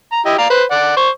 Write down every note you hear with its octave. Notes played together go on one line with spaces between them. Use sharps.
A#5
E4 G4 D#5
D5 F5 A#5
B4 C5
D5 F#5
C5 C#6